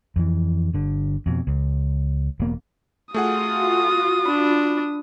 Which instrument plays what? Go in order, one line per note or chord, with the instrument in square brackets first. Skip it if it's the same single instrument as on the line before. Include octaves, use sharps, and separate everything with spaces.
[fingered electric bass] F2 E3
G1 D3
F2 B2
C#2
E1 A#3 B3
[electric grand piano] A3 G#4 F#5 [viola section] F4 F#4 [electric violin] D#6
[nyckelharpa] D4 [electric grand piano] B5